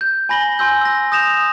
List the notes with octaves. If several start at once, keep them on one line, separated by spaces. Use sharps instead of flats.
G6
G#5 B5 A#6 F#7 G7
G#5 C6 E6 G6
E6 A#6
D#6 G6 A#6 E7 F7